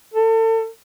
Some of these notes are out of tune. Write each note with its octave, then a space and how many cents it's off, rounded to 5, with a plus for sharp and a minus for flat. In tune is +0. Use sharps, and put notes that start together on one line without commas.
A4 +35